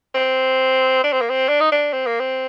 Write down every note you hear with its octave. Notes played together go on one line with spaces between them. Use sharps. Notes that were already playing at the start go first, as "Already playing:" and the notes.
C4
D4
C4
A#3
C4
D4
D#4
D4
C4
A#3
C4